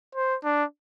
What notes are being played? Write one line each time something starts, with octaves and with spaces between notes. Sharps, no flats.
C5
D4